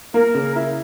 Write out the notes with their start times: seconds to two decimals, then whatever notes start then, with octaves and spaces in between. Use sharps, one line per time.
0.14 A#3 A#4
0.35 C#3
0.56 E4